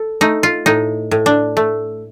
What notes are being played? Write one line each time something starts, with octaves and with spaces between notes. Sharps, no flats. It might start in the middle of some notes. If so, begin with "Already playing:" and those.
Already playing: A4
A3 D#4
F4
A2 D#4
A2
D4
A3